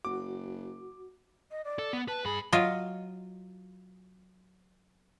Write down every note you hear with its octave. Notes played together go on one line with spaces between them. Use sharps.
F#1 F#4 D6
D#5
D5
A4
B3
B4 A5
G2 G#4 B5
F#3 F4 D#5